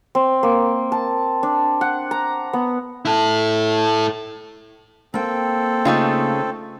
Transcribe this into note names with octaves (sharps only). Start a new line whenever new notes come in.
C4
A#3
A5
D4
F#5
A#5
B3
E4 A4
A#3 C4 A4 G5
C#3 A3 D#4 F4